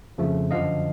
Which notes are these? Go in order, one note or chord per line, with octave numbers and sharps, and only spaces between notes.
F2 C#3 F3 A3
F#2 D3 F3 D#5 F5